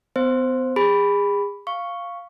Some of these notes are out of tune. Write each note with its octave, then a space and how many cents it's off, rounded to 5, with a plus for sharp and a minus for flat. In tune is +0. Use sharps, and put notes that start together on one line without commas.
B3 +40 C5 +0
G#4 -35 B5 +0
F5 +0 C#6 +0